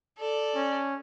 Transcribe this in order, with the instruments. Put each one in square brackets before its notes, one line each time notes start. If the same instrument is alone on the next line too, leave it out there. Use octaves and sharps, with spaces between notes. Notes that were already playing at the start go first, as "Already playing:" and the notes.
[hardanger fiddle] A4 D5
[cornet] C#4